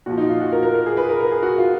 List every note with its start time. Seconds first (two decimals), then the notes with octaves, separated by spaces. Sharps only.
0.06 A#2 F3 F#4
0.18 D#4
0.29 F4
0.40 F#4
0.52 A#4
0.63 A#4
0.74 A#4
0.86 G#4
0.97 B4
1.09 A#4
1.20 A#4
1.32 G#4
1.43 F#4
1.58 F4